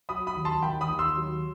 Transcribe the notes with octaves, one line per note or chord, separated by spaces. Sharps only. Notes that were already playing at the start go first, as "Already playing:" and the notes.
F#3 B5 D#6
B5 D#6
D#2
A5 C6
D#3 G5 B5
B5 D#6
D#2
C6 E6
F#3